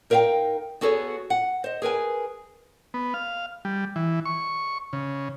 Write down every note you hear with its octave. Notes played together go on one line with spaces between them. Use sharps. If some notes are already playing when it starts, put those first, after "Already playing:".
D#4 A#4 C5 E5 F5 G5
B3 F#4 G#4 A4 C5 C#5
F#5
C5 D#5
G#4 A#4 B4 G#5
B3
F5
G3
E3
C#6
C#3